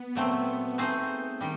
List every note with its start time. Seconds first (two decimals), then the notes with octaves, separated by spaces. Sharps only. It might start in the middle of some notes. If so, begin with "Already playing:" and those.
Already playing: B3
0.15 A#2 F#3 A3 C4
0.78 A3 C4 D#4 G#4 C5
1.41 D#3 G3